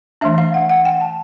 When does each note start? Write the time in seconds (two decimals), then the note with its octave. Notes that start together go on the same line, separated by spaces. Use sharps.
0.21 E3 A3 D4 E5
0.38 F5
0.54 F#5
0.70 F#5
0.85 G5
1.01 A5